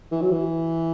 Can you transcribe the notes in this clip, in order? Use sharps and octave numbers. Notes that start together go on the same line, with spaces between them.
E3
F#3
E3